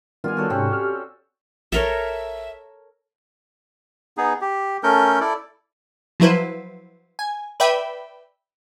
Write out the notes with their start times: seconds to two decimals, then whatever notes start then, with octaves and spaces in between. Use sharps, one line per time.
0.24 D#3 G3 B3 F4 D5 G#5
0.37 F#4 A4 C#5
0.50 G#2 C3 C4 C#4 F#5
0.72 G4 F6
1.72 A#1 A4 A#4 C#5 E5
4.17 B3 D#4 G#4
4.41 G4
4.83 A3 C#4 A4 A#4 G6
5.21 E4 A4 D5
6.20 F3 F#3 E4 B4 C5
7.19 G#5
7.60 B4 D5 E5 G5 B5